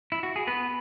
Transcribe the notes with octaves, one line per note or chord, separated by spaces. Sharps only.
E4
F#4
G#4
B3 B4